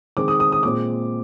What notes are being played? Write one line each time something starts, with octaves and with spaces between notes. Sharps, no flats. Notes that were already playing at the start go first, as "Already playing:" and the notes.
D#3 G#3 C4 D6
D#6
D#6
D#6
A#2 G#3 C4 D6